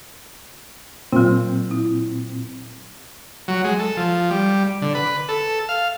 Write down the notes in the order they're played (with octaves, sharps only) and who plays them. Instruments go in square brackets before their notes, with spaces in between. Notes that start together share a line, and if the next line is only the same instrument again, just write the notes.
[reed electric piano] A#2 C4 [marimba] F#3 F4
[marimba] E4
[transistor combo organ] F#3
G#3
A4
F3
G3
D3
B4
A4
F5